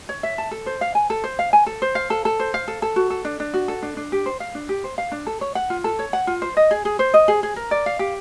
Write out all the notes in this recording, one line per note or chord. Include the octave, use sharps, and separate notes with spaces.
C#5
E5
A5
A4
C5
F5
G#5
A4
C5
F5
G#5
A4
C5
F5
A4
A4
C5
F5
A4
A4
F#4
A4
D4
D4
F#4
A4
D4
D4
G4
C5
F5
D4
G4
C5
F5
D4
A4
C#5
F#5
F4
A4
C#5
F#5
F4
C5
D#5
G#4
G#4
C5
D#5
G#4
G#4
A#4
D5
F5
G4